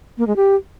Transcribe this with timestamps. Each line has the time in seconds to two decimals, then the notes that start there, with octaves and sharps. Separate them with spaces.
0.18 A#3
0.27 G#3
0.36 G4